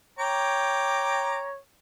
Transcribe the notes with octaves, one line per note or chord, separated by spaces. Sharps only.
C#5 G5 A#5 D6